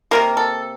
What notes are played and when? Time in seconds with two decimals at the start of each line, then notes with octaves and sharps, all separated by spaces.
0.11 C3 G3 A#3 A#4
0.37 A4